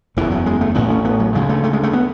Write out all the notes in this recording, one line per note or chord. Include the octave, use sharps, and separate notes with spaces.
F#1 E2 C#3 E3
F#3
G#3
A3
A1 A2 B3
C#4
B3
F#3
D2 C#3 G#3
A3
A3
G#3
A3
B3